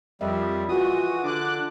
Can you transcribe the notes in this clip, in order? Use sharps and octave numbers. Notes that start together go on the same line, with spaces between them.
F2 G3 A#4 D#5 E5
E3 F4 F#4 G#4 D#6
D3 D4 D6 F#6